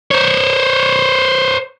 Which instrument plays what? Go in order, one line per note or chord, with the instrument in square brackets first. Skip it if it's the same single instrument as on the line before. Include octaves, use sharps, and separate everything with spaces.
[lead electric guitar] C5 C#5